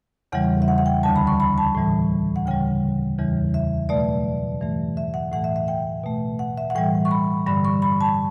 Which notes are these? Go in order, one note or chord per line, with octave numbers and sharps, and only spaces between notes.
E2 C#3 E3 G3 F#5
E5
F#5
F#5
G5
D2 D3 G3 A5
B5
C#6
B5
A5
A2 E3 G3
F#5
D2 C#3 G3 G5
E2 C#3 E3 G3
E5
B2 F#3 A3 D5
G2 E3 A3
E5
F#5
A2 E3 A3 F#5
E5
E5
G5
B2 A3
F#5
E5
F#5
A2 E3 G3 G5
C#6
B5
G2 D3 G3 B5
C#6
B5
A5